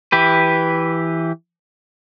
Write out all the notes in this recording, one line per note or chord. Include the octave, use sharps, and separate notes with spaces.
E3 G4 B4